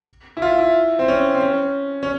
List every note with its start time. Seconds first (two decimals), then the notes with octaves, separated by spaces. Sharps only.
0.37 E4
0.42 F4
0.58 E4
0.99 C4
1.08 C#4
1.35 C4
1.41 C#4
2.03 C#4